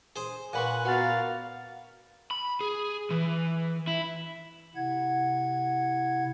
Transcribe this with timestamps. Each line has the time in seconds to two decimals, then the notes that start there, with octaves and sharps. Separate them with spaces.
0.16 G#4 C5
0.53 A#2 B4 F#5 G#5 B5 C#6
0.85 B3 F#4 A#4 F5 F#5 A6
2.31 B5
2.61 G#4
3.11 E3
3.87 E4
4.75 C3 E4 F#5 G#6